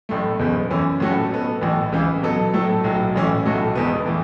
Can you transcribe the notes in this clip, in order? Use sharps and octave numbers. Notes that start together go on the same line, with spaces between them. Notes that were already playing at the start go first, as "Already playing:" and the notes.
A1 A2 A3
F#1 E2 B2 B3
F#2 E3 C#4
A2 A3 C#4 F#4 A4
B2 B3 A4
A1 A2 E3
C#2 C#3 E3
B2 F#3 B3 A4
A2 F#3 A3 E4 A4
B1 A2 F#3
A1 A2 E3 C#4 E4
B1 A2 A3 F#4 A4
E1 E2 B2 B3
A2 E3 A3